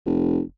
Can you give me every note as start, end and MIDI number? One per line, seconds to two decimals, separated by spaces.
0.06 0.40 29